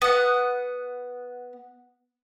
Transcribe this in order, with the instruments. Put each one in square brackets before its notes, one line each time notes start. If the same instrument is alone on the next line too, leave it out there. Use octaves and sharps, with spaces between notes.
[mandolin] B3 F#5